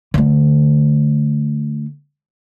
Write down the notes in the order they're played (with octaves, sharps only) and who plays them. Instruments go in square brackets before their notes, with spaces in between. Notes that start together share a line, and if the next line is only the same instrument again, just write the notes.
[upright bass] D3 A3